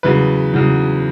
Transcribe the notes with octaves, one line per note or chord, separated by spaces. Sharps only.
E2 C#3 F#3 B4
E2 C#3 F#3